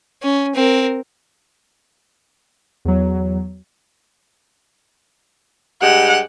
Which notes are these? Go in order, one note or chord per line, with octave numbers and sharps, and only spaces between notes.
C#4
C4 A#4
E2 F#3
G2 G#3 G4 F#5